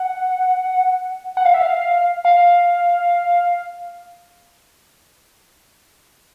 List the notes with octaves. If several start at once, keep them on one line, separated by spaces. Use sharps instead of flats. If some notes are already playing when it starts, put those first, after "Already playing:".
Already playing: F#5
F#5
F5
E5
F5
F5